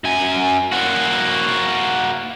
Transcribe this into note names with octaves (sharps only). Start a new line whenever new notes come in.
F#2 G#5
A#3 F#4